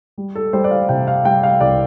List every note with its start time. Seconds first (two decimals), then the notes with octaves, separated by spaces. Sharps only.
0.18 G3
0.35 A4
0.53 G3 C5
0.64 D5
0.71 F5
0.89 C3 G5
1.08 F5
1.25 G3 G5
1.43 F5
1.60 C2 D5